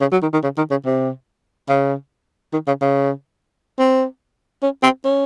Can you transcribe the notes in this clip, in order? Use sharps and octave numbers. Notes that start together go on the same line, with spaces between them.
C#3
F#3
D#3
D#3
C#3
D#3
C#3
C3
C#3
D#3
C#3
C#3
C4
C#4
C4
C#4